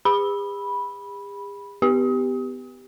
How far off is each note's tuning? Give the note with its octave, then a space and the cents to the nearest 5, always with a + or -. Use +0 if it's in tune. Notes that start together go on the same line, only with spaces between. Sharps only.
G#4 -45 B5 -10
B3 +25 G4 +0